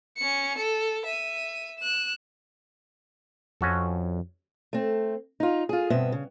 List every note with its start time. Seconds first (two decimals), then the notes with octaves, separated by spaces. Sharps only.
0.17 C#4 C#7
0.58 A4
1.05 E5 D#7
1.78 F#6 E7
3.61 F2 C#4 F#4 A4
4.73 A3 C4
5.40 D#4 F4
5.69 F4 G#4
5.90 G2 B2 B3 C4 E5
6.12 C#3